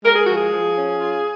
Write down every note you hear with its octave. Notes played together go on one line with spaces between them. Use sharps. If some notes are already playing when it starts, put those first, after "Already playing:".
G#3 A#4
G#4
F3 F#4
G#4
F3
C#4
F4